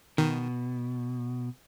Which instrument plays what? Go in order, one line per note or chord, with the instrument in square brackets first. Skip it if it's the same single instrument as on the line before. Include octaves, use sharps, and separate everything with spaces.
[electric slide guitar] B2 [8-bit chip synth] D#3